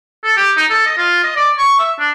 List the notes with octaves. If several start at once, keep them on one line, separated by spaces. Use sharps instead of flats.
A4
G4
D#4
A4
D#5
F4
D#5
D5
C#6
E5
D4